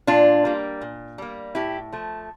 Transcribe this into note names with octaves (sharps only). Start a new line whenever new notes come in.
A#2 D4 F4
G3 A#3
A#2
G3 A#3
A2 E4 G4
F3 A3